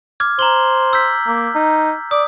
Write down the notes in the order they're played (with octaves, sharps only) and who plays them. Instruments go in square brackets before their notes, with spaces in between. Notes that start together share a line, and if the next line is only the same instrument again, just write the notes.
[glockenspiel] D6 F6 G#6
[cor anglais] C5 [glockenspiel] A#5 F#7 G7
[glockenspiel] E6 G6 B6
[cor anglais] A#3
D#4
[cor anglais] D5 [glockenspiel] D#6